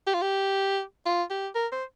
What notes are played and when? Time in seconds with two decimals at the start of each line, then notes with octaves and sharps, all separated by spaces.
0.07 G4
0.14 F4
0.22 G4
1.06 F4
1.30 G4
1.55 A#4
1.72 C5